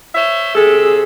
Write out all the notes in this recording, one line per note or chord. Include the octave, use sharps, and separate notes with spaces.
C5 C#5 E5
C3 G#4 A4